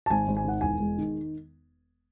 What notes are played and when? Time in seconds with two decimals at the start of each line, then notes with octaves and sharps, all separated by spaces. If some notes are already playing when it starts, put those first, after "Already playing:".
0.06 A5
0.10 G#1 G#5
0.28 G#1
0.37 G#5
0.45 D#3 F#5
0.61 E1 G#5
0.80 G#3
0.98 D#3